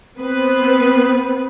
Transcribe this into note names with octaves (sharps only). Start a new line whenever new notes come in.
B3 C4 B4